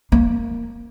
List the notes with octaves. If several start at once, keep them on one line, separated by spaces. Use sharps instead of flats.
A#3